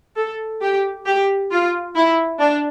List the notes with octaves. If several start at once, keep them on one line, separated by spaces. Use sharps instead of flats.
A4
G4
G4
F4
E4
D4